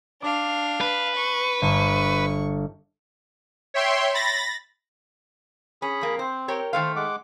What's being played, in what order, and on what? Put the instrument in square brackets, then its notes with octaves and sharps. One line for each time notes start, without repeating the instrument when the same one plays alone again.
[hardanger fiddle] D4 F5 [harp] D6
[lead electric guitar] B4
[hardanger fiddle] C#6
[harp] G1 [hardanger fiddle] C#6
[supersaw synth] C#5 E5 G5 C6
B5 A6 A#6
[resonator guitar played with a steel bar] C#4 [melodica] G#4 B5
[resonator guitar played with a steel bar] F2 A#3
[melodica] C4 [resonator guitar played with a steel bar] C5
[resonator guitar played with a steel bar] G4 A#4 C#5
[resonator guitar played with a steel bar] D#3 A3 F5 [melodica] C5
[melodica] G#3 F#5 D6